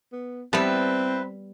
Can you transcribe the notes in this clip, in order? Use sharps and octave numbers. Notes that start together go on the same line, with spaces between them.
B3
G3 B3 C4 E4 B4 A5